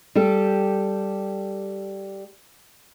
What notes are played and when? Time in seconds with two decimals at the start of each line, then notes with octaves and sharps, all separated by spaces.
0.15 G3 G4 A4